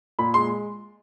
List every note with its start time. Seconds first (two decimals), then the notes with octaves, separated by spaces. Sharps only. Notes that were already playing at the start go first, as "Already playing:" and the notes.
0.19 A#2 B5
0.34 G#3 C6